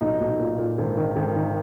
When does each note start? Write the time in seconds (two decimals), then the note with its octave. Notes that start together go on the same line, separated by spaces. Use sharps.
0.01 B1 D#4
0.20 B1
0.39 A#2
0.58 A#2
0.78 G#1
0.97 D#3
1.16 G#1
1.36 D#3